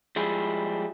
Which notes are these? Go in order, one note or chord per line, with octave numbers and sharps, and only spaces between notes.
F3 G3 G#3 E4 G#4